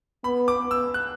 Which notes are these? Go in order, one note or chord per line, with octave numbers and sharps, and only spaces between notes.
B3 B5
D6
B3
E6
F#6